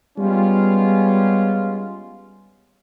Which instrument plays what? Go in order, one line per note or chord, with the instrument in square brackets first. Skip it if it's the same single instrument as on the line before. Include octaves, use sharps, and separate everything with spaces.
[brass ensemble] G3 G#3 B3 C#4 F4